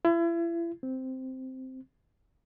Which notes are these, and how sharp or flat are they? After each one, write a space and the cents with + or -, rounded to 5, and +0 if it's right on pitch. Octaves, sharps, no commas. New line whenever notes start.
E4 +35
C4 -5